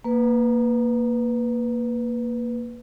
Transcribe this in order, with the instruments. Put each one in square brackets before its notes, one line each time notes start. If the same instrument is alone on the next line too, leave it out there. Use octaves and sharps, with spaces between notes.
[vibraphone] A#3 B4